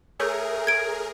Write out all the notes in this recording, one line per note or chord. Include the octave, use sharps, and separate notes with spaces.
A3 G#4 A#4 C#5 D#6
G#6 D7